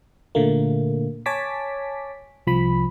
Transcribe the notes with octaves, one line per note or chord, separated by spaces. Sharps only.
A#2 D3 A3 A#3
C#5 G#5 A5 D6 B6
C2 F3 B5